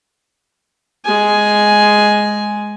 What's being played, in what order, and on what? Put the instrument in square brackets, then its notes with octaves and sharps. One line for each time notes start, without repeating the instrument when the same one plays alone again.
[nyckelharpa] G#3 G#5